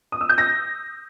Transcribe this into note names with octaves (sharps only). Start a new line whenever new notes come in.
D#6
E6
G6
A#6